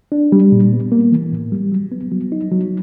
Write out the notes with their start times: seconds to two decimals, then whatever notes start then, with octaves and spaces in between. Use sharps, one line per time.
0.12 D4
0.32 G3
0.52 A#2
0.73 B3
0.92 A#3
1.12 E3
1.32 A2
1.52 G3
1.72 F#3
1.92 B3
2.12 F#3
2.32 D#4
2.52 F#3